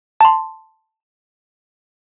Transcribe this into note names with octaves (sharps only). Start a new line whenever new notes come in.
A5 C6